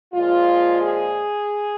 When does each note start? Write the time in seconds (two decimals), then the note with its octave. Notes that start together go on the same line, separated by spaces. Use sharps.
0.14 A#2 F3 G#3 F4
0.83 G#4